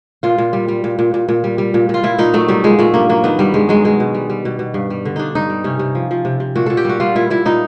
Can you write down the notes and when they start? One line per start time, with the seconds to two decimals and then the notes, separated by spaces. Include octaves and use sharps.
0.23 A#2 F4
0.38 A#2
0.53 G3
0.68 G3
0.84 A#2
0.99 A#2
1.14 A#2
1.28 A#2
1.44 G3
1.58 G3
1.74 A#2
1.89 A#2 F4
2.03 A#2 E4
2.18 A#2 D#4
2.34 F#3 A3
2.48 F#3 G3
2.64 A#2 G#3
2.79 A#2 A3
2.94 G2 A#3
3.09 F#3 A#3
3.24 D#3 B3
3.39 G2 G3
3.54 G2 G#3
3.69 F#3 G#3
3.84 B2 G#3
4.00 B2
4.14 G3
4.30 G3
4.45 B2
4.59 B2
4.74 G2
4.90 G3
5.05 D3
5.16 G2 D4 D#4
5.35 G2 D#4
5.50 G3
5.64 C3 C#4
5.79 C3
5.95 F3
6.11 F3
6.25 C3
6.40 C3
6.55 A#2 F#4
6.66 A#2 A4
6.77 G4
6.85 G3 F#4
7.00 G3 F4
7.15 A#2 E4
7.30 A#2 E4
7.45 A#2 D#4